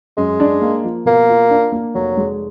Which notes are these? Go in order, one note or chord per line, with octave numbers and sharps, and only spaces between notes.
F#2 G#3
D4
A#3
F3
B2 A#3
F4
D4
A#3
F1 F#3
G#3